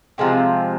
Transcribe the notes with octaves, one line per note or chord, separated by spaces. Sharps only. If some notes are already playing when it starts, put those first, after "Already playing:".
C3 F3 G#3 C4